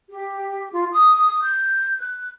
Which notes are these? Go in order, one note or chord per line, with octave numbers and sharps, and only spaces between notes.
G4
F4
D#6
G6
F#6